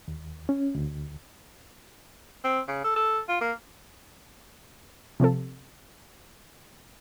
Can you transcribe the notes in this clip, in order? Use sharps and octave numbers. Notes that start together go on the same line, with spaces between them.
D#2
C#4
D2
C4
C#3
A4
A4
F4
A#3
C3 F3 C4 A4